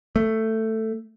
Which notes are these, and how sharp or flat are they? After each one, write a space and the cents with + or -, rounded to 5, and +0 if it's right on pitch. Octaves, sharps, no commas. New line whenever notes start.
A3 +10